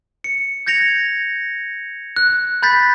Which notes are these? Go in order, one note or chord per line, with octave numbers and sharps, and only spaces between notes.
C#7
G6 G#6 A#6 C#7 F7
F#6
B5 G6 A6 B6